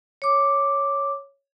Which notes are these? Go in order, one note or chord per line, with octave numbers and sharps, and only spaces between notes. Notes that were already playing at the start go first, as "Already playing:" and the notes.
C#5 D6